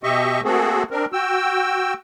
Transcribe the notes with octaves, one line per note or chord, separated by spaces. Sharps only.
B2 G4 D#5 E5 C#6
A3 A#3 C4 F#4 G#4 A4
C4 D4 A#4
F#4 G5 E6